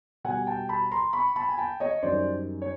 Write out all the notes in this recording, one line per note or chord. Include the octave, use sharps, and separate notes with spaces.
B2 G3 F#5 G#5
G5 A5
A5 B5
A#5 C6
B5 C#6
A5 B5
G#5
G5 A5
C#5 D#5
F#2 D#3 G3 C5 D5
C#5